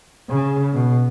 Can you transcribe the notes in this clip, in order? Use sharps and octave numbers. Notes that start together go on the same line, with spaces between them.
C#3
B2